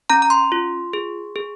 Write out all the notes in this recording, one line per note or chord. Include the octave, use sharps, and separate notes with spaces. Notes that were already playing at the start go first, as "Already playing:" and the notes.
C#4 A#5
A#5
C6
F4
G#4
G#4